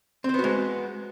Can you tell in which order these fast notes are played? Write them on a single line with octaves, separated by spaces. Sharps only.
C4 C5 B3 F#4 G#3